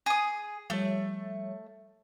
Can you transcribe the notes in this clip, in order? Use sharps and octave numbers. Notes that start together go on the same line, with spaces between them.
G#4 D#6
F3 G3 A3 C#5